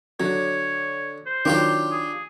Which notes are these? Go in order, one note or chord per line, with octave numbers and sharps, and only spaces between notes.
D3 F#3 C#5
C5
D#3 F#3 D4 F4 G4
G#4